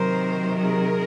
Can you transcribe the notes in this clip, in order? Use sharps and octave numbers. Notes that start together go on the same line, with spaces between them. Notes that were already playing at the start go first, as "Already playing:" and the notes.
Already playing: C3 D#3 F#3 A#4 C5
G#4 A#4